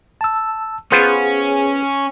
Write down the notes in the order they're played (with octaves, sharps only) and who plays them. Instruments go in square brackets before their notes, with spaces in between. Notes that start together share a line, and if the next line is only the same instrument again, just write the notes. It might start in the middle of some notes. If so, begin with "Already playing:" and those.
[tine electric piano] A5 E6
[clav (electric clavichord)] B3 F4 C5 [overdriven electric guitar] C#4 [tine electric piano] G#4